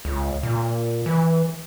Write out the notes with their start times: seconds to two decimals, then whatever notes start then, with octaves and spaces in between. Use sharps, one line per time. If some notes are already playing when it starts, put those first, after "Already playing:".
0.05 C#2
0.43 A#2
1.06 E3